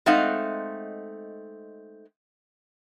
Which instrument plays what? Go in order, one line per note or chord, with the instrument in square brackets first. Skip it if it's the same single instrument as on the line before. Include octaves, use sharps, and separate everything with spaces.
[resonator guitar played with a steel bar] G#3 A3 C4 D#4 F5 F#5